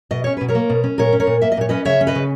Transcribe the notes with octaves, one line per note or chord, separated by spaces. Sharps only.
B2 D#5
C#4 C#5
B2 B4
A#4 C#5
A#3
B2
C#4
A#2 A#4 C#5
C#4
A#4 C#5
A#2
A#3 E5
D#5
A#2 C#5
C#4 B4 D#5
C#3 C#5 E5
C#4
B4 D#5
C#3